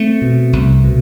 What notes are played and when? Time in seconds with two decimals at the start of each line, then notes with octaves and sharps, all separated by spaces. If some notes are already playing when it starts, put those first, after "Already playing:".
Already playing: A3 C4
0.22 B2
0.53 C2
0.84 B2